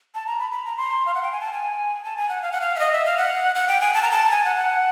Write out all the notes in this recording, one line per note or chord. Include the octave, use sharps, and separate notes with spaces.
A5
A#5
B5
B5
A#5
C6
F5
F#5
G5
G#5
A5
G#5
A5
G#5
F#5
F5
F#5
F5
E5
D#5
E5
F5
F#5
F#5
G5
G#5
A5
A#5
A5
G#5
F#5
F#5